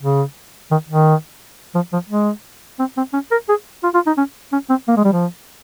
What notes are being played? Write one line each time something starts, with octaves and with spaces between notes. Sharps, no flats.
C#3
D#3
D#3
F3
F3
G#3
C4
C4
C#4
A#4
G#4
F4
F4
D#4
C#4
C#4
C4
A#3
G#3
G3
F3